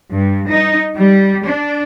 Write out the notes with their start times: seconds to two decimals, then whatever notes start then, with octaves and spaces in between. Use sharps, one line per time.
0.13 G2
0.50 D#4
0.96 G3
1.46 D4